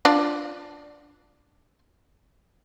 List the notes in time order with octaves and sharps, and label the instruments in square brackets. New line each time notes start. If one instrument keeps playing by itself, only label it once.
[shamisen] D4 F4 D5